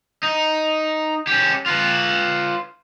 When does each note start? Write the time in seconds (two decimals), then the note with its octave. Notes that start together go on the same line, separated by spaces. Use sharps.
0.23 D#4
1.27 C#4 G4
1.66 F4 B4